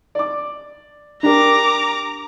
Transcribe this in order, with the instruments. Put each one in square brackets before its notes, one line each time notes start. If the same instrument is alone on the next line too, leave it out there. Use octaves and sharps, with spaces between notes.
[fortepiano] D5 D6
[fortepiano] D4 G4 A#4 [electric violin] A#5 D6